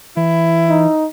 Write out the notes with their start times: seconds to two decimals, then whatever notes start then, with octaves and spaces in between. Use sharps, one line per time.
0.17 E3 E4
0.70 D#4